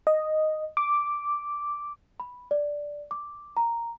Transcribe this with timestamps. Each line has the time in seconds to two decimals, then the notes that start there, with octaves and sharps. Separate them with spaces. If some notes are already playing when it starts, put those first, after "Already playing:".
0.07 D#5
0.77 D6
2.20 B5
2.51 D5
3.11 D6
3.57 A#5